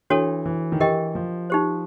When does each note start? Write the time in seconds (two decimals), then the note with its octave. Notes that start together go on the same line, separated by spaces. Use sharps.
0.10 E3 D4 F#4 A4 C#5
0.45 E3
0.72 D#3
0.80 E3 G4 A#4 D#5 G5
1.15 F3
1.50 D#4 G4 C5